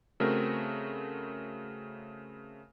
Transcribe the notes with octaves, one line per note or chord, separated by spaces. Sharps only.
C#3 A3 C4 F#4 A#4